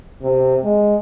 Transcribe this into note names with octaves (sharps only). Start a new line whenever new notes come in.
C3
G#3